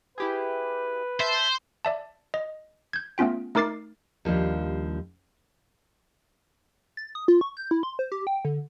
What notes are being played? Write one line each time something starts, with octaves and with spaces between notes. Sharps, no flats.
E4 G4 G#4 B4
C5 E5 A5
D5 E5 A5
D#5
G6 G#6
A3 B3 C#4 F4 G5
A3 D#4 A#4 D6 A6 C7
D#2 F3 G3 D4
A6
D#6
F4
C#6
G6
E4
C6
C5
G4
G5
D3